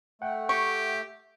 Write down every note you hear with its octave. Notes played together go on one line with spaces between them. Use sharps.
A3 F#5 G5
G4 C#6